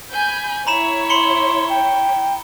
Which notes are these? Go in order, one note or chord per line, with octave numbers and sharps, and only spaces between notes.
G#5 B5 G6
E4 C#5 A#5 B5 E7
B5 C6 C#7 G7
G5